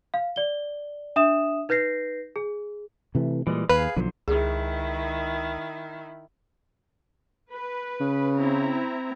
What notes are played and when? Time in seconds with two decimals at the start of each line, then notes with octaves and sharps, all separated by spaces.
0.14 F5
0.36 D5 G7
1.16 D4 E5 D#6 E7
1.69 D#4 B4 G6 A#6 C7
2.36 G#4
3.15 C3 E3 A3
3.47 A#2 E3 G3 G#3
3.70 D#2 G#4 B4 F5
3.96 B1 D3 F3 F#3 C5
4.28 C#2 D#3 E4 G#4
7.51 B4
8.00 C#3
8.36 C4 E4 A#5